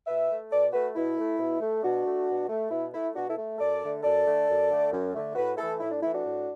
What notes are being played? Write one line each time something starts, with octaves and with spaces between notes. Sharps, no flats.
B2 B4 E5
A3
B2 A4 D5
A3 F#4 B4
B2 E4
A3
B2
A3
B2 D4 F#4
A3
B2
A3
B2 E4
A3 E4
B2 D4 F#4
E4 A4
A3
F#2 A4 D5
D3 A3
F#2 A4 D5
D3 A3
F#2
D3 A3
F#2
D3 A3
A2 F#4 B4
E3 A3 E4 A4
A2 E4
D4
E3 A3 E4
D4 F#4
A2